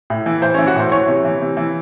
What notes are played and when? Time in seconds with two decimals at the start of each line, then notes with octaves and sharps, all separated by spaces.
0.10 A2
0.26 E3
0.42 A2 C5
0.54 E3 C#4 C#5
0.67 F#4 F#5
0.76 A2 C5 C6
0.91 E3 C#5 C#6
1.08 C3
1.24 E3
1.42 C3
1.57 E3